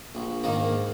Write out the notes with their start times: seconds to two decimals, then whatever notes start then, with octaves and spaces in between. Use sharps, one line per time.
0.15 A#1
0.44 G#2 D#3 A#3